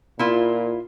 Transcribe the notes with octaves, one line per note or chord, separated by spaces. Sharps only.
A#2 E4 F4